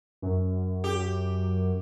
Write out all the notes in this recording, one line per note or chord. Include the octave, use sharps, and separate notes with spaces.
F#2
G4